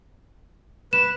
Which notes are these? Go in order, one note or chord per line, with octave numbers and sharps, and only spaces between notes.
B4 E7